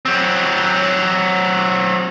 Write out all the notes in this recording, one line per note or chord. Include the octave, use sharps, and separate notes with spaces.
F#3 C4